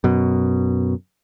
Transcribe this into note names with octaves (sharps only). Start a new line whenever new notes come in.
F#2 B2